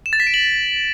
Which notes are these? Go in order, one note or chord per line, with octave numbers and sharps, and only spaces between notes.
E7
A6
B6
D7
F#7